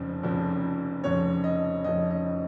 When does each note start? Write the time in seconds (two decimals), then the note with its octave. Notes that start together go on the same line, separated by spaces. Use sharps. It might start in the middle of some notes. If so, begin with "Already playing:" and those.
Already playing: F1 F2 C#3 F3
0.23 F1 F2 C#3 F3
1.04 F1 F2 C#3 F3 C#5
1.44 D#5
1.84 F1 F2 C#3 F3 D#5
2.10 D#5